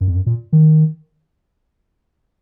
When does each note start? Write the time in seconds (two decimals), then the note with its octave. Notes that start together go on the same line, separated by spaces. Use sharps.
0.01 F#2
0.08 F2
0.16 F#2
0.26 A#2
0.53 D#3